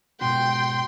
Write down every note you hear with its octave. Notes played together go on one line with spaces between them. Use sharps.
G#2 B2 F#4 G5 C6